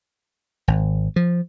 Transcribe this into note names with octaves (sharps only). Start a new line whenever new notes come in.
G#1
F3